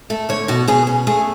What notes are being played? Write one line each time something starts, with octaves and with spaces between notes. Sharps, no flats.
A3 A4
D3 C#5
B2 F#4
B2 G#4
C#4
A3 G#4